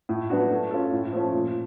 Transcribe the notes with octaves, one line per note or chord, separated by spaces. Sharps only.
A2
F#3 B3 D4 F#4
A3
C#4 F4 A4
A2
F3 A3 C#4
A#2